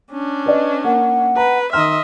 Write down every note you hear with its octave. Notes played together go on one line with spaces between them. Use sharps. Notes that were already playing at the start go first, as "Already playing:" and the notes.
C#4 D4
B4 D5 D#5
A#3 F#5
B4 A#5
D#3 D#5 E5 A#5 C6 F6